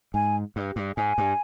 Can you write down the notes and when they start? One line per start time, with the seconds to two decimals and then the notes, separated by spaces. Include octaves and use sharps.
0.14 G#2 G#5
0.56 G2
0.76 G2
0.97 G#2 G#5
1.18 G2